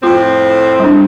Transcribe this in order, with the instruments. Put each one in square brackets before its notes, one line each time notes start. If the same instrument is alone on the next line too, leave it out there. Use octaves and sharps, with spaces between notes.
[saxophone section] F2 A2 C4 [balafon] F4
[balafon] G3 D4